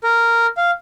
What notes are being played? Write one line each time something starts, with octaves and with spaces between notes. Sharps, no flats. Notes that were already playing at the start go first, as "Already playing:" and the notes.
A#4
F5